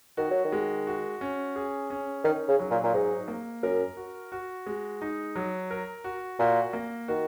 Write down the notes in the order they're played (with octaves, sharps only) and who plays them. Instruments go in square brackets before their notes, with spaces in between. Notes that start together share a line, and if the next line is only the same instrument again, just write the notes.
[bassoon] D#3 [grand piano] F#4
[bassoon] F#3
D#3
[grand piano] G#3
F#4
C#4
G#4
C#4
[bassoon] D#3 [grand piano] D#4
[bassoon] C#3
[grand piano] F#3
[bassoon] A#2
A#2
[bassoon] G#2 [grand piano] D#4
[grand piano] A#3
[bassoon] F#2 [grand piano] A#4
[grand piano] F#4
F#4
G#3
D#4
F#3
A#4
F#4
[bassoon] A#2 [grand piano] F#4
[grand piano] A#3
[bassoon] D#3 [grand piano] F#4